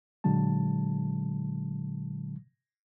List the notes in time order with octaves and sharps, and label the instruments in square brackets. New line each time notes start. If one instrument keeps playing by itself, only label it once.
[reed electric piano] A#2 D3 F#3 G#3 A5